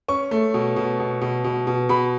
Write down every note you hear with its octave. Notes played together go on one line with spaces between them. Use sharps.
C#4 C#6
A3
B2
B2
B2
B2
B2
B2
B2 B5